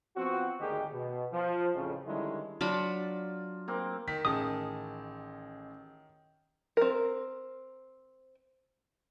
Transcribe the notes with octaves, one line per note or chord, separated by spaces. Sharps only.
F3 B3 C4 F#4
G#1 D2 D#3 D#4 G4 G#4
B2
F3
A1 F2 C#3
D3 D#3 G3 G#3 C#4 E4
F#3 D4 F4 B5
A#3 C4
D#3 B6
A1 D#3 G#4 A5 D#6
C4 A#4